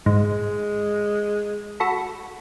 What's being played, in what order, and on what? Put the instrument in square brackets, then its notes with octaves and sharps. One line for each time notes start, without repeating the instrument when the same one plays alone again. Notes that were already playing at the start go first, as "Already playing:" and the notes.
[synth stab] G#2 [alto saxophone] G#3
[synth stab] F#4 A4 B5